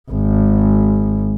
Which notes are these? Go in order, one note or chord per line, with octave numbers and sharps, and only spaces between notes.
G#1